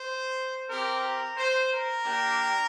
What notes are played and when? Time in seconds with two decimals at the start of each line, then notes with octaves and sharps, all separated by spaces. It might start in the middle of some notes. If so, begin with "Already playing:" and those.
Already playing: C5
0.68 C4 G4 A#4
1.02 A#4
1.36 C5
1.69 A#4
2.02 A#3 D4 G4